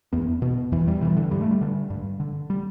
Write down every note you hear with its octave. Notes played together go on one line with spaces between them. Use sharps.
E2 B3
B2 B3
E2 E3
G3
B2 E3
D3
G2 G3
A3
G3
D3
G2
D3
G3